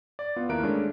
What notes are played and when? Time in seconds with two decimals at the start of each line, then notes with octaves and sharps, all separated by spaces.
0.19 D5
0.36 B3 F4
0.49 D#2 A#3 E4 A#4 F#6 D7
0.63 G#3 A3 C#4 D4